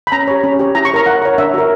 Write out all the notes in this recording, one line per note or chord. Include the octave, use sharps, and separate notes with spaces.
B5
C#4 A#5
G4 C#5
C#4
G4 C#5
E4 A#5
C#6
A#4 C#5 A#5
E4 F#5
A#4 C#5
D4 E5
F#4 A#4